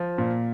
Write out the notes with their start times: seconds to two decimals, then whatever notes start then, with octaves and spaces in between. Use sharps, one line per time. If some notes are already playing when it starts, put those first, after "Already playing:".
Already playing: F3
0.18 A#2